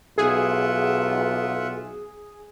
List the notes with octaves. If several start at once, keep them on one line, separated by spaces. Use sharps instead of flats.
B1 F4 G#4 E5 F#5